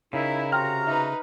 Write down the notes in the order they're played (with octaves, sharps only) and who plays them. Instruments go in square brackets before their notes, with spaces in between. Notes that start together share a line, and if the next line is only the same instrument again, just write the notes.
[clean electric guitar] C#3 [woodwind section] D#4 E4 [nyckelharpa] A#4
[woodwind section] C3 F#4 A#5 [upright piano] G5 C6 F6
[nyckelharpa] D#4 B4 [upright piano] E5